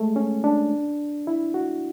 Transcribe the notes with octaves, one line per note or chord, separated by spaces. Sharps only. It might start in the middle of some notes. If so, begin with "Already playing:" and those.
Already playing: G#3 A3
C#4
D4
E4
F#4